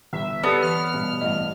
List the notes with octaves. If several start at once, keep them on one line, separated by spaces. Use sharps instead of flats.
G1 E5
B3 G4 A4 B4 D5 B5
E3 F6
G2 B2
A1 G2 D#5 F#5